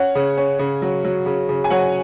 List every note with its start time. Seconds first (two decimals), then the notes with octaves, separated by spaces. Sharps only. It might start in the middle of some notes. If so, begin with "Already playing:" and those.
Already playing: C#4 C#5 F#5
0.15 C#3
0.38 C#4
0.59 C#3
0.82 F#3
1.05 F#3
1.26 C#3
1.49 C#3
1.64 G#5
1.70 F#3 C#5 F#5